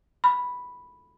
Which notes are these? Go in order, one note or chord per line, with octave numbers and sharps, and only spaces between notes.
B5